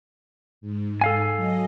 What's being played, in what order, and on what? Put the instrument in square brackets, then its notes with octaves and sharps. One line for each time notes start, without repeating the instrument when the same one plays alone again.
[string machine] G#2
[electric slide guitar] A4 F5 G#5
[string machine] F#3 D#5